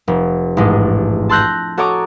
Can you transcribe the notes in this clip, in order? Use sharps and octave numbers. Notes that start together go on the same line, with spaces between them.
F1
A1 G#2 G#3 D4
A5 C6 E6 F#6 G6 A#6
F#4 A4 C#5 D#5 A#5 D6